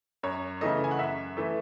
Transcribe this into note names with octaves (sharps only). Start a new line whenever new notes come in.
F#2 C#5
C#3 E3 A3 D#5
G#5
F#5
F#2 E5
E3 A3